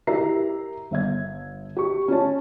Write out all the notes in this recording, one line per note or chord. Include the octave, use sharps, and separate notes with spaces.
E4 G4 A#4 E5 A#5 C7
G1 E5 G#6
G4 C#6
C#4 F4 C#5 A5